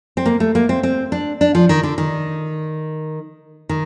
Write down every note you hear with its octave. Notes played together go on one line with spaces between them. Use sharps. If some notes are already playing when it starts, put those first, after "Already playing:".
C4
A#3
A3
A#3
C4
C4
D4
D4
F3
D#3
D3
D#3
D#3